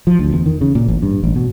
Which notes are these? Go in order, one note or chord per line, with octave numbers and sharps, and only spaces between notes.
F3
D2
E2
D#3
C#3
A#2
A1
G2
A1
B2